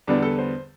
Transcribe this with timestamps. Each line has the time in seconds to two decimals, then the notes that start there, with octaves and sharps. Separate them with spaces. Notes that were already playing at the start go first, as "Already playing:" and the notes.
0.07 E2 D3 G3 B3 D4
0.23 A4
0.39 C5